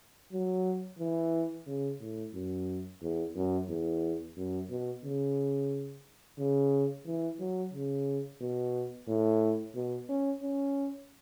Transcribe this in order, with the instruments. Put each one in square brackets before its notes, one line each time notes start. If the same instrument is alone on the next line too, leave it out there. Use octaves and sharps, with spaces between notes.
[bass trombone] F#3
E3
C#3
A2
F#2
E2
F#2
E2
F#2
B2
C#3
C#3
E3
F#3
C#3
B2
A2
B2
C#4
C#4